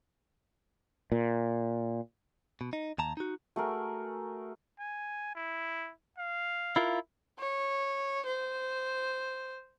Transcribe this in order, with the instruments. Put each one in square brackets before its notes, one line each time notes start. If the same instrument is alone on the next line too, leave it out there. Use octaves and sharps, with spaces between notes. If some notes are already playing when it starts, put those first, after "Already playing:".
[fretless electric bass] A#2
[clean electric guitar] B2
D#4
D#2 A5 A#5
D#4 F#4
[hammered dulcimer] A3 [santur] F#4 G#4 A#4
[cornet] G#5
E4
F5
[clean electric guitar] E4 F4 A#4
[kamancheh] C#5
C5